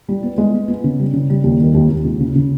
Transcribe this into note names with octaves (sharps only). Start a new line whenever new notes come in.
G3
B3
G#3
B3
B3
C#3
G3
C#3
G3
D#2
D#3
D#2
D#2
C#2
C#3
C#3